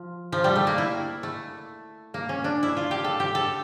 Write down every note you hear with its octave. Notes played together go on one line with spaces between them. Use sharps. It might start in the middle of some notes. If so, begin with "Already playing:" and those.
Already playing: F3
F3
G3
A3
A#3
E4
A3
A#3
C#4
D4
E4
F4
G4
A4
G4
A4